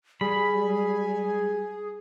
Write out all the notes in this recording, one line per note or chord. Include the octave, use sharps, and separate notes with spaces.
G3 G#4 G#5 B5